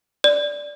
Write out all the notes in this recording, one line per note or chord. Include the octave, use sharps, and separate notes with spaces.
D5